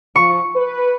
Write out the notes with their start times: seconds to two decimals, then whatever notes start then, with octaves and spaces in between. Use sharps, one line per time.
0.16 F3 C#6
0.55 B4